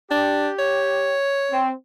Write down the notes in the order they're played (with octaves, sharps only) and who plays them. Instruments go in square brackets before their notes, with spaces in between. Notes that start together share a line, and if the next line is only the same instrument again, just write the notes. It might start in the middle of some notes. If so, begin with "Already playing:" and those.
[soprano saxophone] D4 [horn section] G4
[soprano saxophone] C#5
[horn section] C4